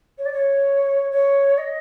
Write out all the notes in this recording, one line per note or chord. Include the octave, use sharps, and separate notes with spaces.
C#5
D5
C#5
C#5
D#5